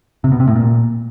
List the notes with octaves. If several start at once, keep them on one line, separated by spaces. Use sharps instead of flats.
C3
B2
C3
A2
A#2